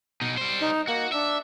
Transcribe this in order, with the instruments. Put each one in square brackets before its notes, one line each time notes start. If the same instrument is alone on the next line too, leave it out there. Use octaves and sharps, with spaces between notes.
[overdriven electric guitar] B2 D#4
G3 C5
[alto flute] D#4
[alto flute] A#3 [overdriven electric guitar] F#4
[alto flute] D4 [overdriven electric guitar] E5